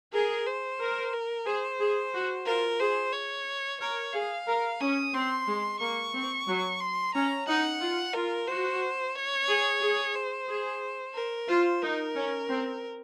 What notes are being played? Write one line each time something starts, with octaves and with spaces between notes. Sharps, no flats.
G#4 A#4
C5
A#4
A#4
G#4 C5
G#4
F#4
F4 A#4
G#4 C5
C#5
A#4 C#5
G#4 F5
A#4
C#4 D#6
C4 C6
G#3
A#3 C#6
C4
F#3
C6
C#4 A#5
D#4 F#5
F4
F4 A#4
F#4 C5
C#5
G#4
G#4
C5
G#4
A#4
F4 C5
D#4 A#4
C#4
C4